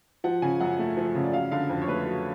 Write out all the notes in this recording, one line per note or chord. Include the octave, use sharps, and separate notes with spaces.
F3 F#5
C#3 G#5
F#2 F#5
A3
F3
C#3
D5
F#3 F5
D3 F5
F2
C#5
A3 B4
F#3